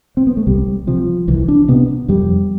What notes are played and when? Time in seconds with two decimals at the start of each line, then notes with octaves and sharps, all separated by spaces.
0.17 C4
0.27 B3
0.37 A3
0.47 C2 G3
0.87 C3 F3
1.28 C2 E3
1.48 D4
1.68 C3 B3
2.08 F2 G3